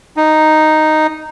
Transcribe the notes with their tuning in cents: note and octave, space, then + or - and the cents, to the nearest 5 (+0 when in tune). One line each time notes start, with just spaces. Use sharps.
D#4 -5